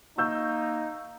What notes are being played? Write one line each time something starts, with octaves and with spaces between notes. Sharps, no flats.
A#3 D#4 C#6 E6 G6